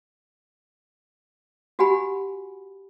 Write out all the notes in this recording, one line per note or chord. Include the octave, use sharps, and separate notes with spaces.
F#4 G4 F#5 G#5 B5